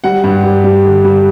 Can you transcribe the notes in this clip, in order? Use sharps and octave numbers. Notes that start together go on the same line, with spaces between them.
G3 F#5
G2
G3
G3
D3
G3